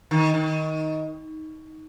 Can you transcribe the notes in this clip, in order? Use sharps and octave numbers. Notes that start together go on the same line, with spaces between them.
D#3
D#3